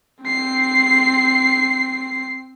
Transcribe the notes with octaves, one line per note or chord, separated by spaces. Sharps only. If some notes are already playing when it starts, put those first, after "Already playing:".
C4 C7